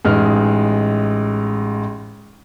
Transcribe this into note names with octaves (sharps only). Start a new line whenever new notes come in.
A1 G#3 D#4 F6